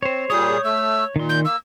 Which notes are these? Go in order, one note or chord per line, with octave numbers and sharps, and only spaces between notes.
C4 C5 C#5
A#2 G3 G#4 C#5 D#6 G6
A3 E6
A#2 D#3 C6
G6
A#3 E6